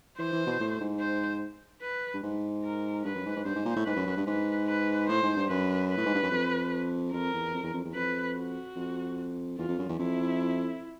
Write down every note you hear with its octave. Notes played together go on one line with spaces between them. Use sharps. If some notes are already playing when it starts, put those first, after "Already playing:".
E3 C5
E3
B2
A2
G#2
C5
B4
G2
G#2
A#4
G2 B4
F#2
G#2
G#2
G2 C5
G#2
A#2
A2
G#2 B4
F#2
F#2
G2
G#2 B4
B4
A2 C5
G#2
G2
F#2 B4
B4
A2
G#2
G2
F#2
F2
F2 A#4
E2
F2
E2
F2
E2
F2 B4
F#4
F2
E2 F4
F2
F#2
E2
F2 E4